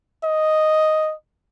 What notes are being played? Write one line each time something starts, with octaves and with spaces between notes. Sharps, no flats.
D#5